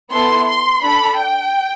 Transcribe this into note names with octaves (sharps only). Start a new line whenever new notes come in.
B3 E4 A4 C6
C6
D4 A4 B5
G5